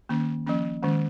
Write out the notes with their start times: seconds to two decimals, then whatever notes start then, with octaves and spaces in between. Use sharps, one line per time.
0.09 D#3 A#3 C#4
0.46 F3 A#3 C#4
0.82 D#3 G#3 C#4